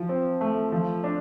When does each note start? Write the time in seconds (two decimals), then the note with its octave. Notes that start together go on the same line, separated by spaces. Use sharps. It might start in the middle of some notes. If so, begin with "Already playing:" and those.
Already playing: F3
0.09 C4
0.41 A3
0.72 F3
1.04 D4